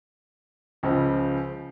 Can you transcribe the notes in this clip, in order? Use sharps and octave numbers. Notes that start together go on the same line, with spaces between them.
C#2 C#3 F3